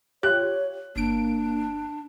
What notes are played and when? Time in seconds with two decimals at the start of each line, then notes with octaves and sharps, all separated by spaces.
0.23 F4 G4 C#5 F#6
0.96 G1 A#3 D4 D7